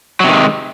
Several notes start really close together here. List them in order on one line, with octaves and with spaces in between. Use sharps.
F#3 C3 D#3 G#3